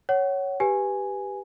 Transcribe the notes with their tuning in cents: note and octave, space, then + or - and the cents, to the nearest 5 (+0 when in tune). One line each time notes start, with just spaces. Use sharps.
C#5 +0 F#5 +25
G4 +0 B4 +0 G#5 +0